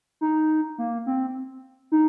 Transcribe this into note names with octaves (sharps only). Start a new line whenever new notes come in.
D#4
A#3
C4
D#4